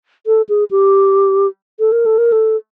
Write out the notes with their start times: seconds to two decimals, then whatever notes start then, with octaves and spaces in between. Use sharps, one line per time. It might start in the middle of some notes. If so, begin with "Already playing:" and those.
0.27 A4
0.49 G#4
0.71 G4
1.80 A4
1.92 A#4
2.06 A4
2.18 A#4
2.32 A4